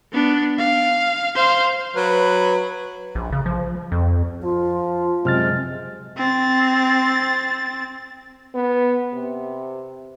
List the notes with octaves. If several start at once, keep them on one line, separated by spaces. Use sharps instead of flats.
B3 D4
F5
C5 F5
F#3 B4
A#1
C#3
F3
F2
F3 F4
F#2 C3 G#3 F6 A6
C4 A6
B3
C3